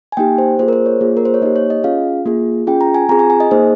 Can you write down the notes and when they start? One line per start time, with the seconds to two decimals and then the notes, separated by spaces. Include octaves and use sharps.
0.12 G#5
0.17 A#3 D#4 G4 G5
0.38 C5
0.59 A#3 F4 G#4 C5
0.68 A#4
0.73 C5
0.86 C#5
1.01 A#3 F4 G#4
1.17 A#4
1.25 C5
1.34 C#5
1.42 A#3 D#4 G4 D#5
1.56 C#5
1.70 D#5
1.83 C#4 F4 G#4 F5
2.26 A#3 F4 G#4
2.67 C#4 F4 G#4 G5
2.81 A#5
2.95 G#5
3.09 C4 F4 G#4 A#5
3.19 G#5
3.30 G#5
3.40 D#5
3.51 A#3 D#4 G#4 C5